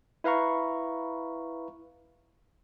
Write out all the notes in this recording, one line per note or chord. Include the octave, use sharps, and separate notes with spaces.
E4 B4 F5 A#5 C#6